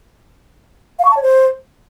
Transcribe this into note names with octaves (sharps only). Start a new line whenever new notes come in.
F5
C#6
A5
C#5
C5